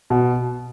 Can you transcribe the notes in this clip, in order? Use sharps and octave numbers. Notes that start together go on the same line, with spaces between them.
B2